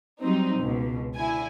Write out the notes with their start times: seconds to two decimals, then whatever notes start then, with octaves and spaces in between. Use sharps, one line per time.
0.20 F#3 G3 C4 D#4
0.58 C#2 B2
1.17 D3 E4 G#5